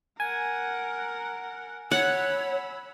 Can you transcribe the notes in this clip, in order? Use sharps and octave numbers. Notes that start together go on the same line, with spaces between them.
A#4 F#5 G#5
C#5 F#5 B5 E6